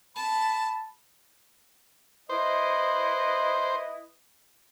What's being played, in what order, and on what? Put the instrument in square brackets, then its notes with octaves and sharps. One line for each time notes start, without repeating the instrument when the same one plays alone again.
[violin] A5 [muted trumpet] B5
[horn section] E4 B4 D#5 [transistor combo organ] C5